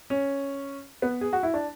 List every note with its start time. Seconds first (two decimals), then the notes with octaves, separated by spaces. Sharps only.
0.10 C#4
1.02 B3
1.21 G#4
1.33 F#4
1.43 E4
1.54 D4